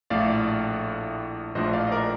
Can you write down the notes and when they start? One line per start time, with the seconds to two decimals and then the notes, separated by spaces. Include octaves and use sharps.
0.10 A#1 A2 A3 D5 F5
1.55 A#1 A2 F3 A3 D4 C5 D#5
1.73 D5 F5
1.87 D#5
1.92 A#4 D5